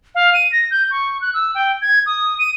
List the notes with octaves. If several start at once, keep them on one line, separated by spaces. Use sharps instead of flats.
F5
D#7
A#6
G6
C#6
F#6
E6
G5
G#6
D#6
D#7